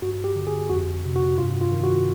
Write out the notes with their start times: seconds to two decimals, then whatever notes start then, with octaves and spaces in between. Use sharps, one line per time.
0.02 G2 F#4
0.24 G4
0.36 D3
0.47 G#4
0.70 F2 F#4
1.05 C3
1.16 F#4
1.38 G2 F4
1.61 F4
1.72 D#3
1.83 F#4